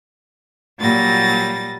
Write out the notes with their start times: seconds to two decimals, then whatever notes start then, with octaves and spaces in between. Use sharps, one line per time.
0.79 A#2 F#3 G3 A6 A#6